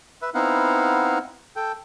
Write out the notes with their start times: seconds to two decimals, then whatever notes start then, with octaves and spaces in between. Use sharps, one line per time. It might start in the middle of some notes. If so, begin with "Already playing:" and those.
0.22 B4 E5
0.34 B3 C4 D#4 E4 F5 F#5
1.56 A4 G5